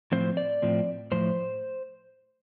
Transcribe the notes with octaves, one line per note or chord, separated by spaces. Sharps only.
A2 F3 C4 C5
D5
A2 F3 C4
A2 F3 C5